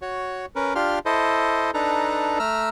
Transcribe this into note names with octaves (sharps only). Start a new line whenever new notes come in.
F#4 C#5
C#4 A#4 B4
D4 F4 G4 C6 F6
E4 A4 C5 D#5
D4 D#4 A4 B4 A#5
A3 A#5 E6 F6